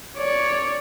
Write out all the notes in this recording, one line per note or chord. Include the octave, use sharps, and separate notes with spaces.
C#5 D5